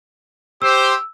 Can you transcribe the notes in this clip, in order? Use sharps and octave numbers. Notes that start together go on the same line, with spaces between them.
G4 C5 E6